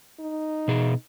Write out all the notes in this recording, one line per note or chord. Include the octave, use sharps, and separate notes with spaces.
D#4
B2 G#4